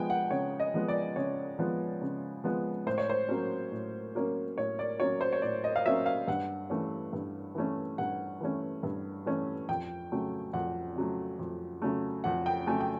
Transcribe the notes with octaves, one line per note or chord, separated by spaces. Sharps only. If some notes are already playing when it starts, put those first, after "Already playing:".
Already playing: F3 G#3 B3 G5 G#5
F#5
C#3 C#5
D#5
F3 G#3 B3
D5
C#3 C#5
F3 G#3 B3
C#3
F3 G#3 B3
A2 C5
C#5
C5
F#3 A#3 C#4
A2
F#3 A#3 C#4
A2 C#5
D5
F#3 A#3 C#4 C#5
C5
C#5
A2 D5
D#5
F5
F#3 A#3 C#4 E5
F5
G2 F#5
E3 A3 C#4
G2
E3 A3 C#4
G2 F#5
E3 A3 C#4
G2
E3 A3 C#4
F2 G5
C#3 F#3 A3
F2 F#5
C#3 F#3 A3
F2
C#3 F#3 A3
F2 F#5
G5
C#3 F#3 A3 G#5
G5